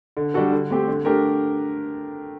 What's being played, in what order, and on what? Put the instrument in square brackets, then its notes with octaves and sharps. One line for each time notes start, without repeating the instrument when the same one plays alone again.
[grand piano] D3
G3 D4 F#4 A4
D3
A3 C4 G4
D3
A3 D4 G4 A#4